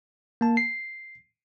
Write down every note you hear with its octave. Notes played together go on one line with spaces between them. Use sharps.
A#3 A5
C7